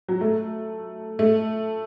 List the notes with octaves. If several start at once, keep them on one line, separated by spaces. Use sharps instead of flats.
F#3
A3
A3